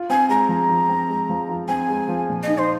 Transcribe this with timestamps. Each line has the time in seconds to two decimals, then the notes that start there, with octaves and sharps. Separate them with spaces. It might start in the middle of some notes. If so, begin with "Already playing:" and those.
Already playing: F4
0.10 C4 G#5
0.29 G#3 A#5
0.49 F3
0.69 F4
0.89 C4
1.08 G#3
1.29 F3
1.49 F4
1.68 C4 G#5
1.89 G#3
2.09 F3
2.29 A#2
2.43 D#4 D#5
2.58 C5